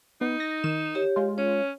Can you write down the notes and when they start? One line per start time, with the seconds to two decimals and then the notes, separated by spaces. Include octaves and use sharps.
0.21 B3 D#4
0.40 A#6
0.64 D#3 E7
0.95 G4 C#5
1.16 G#3 F4
1.38 C#4 C#5